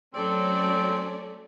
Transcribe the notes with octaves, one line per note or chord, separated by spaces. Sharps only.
F#3 A3 C4 C#4 A4 D5